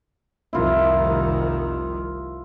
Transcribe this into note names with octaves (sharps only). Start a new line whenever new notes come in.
F1 C2 D#3 E4 F4